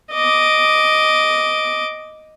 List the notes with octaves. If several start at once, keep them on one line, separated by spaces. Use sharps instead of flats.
D#5 D6